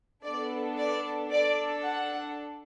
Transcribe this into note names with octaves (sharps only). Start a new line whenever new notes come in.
B3 D4 A4 D5
D5
D4 A4 D5
F#5